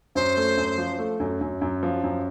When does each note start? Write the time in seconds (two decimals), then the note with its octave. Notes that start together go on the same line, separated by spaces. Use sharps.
0.15 F#2 C5
0.37 A3
0.57 F#2
0.78 F3
0.99 A3
1.20 F#2
1.41 F#2
1.61 F#2
1.83 F3
2.04 F#2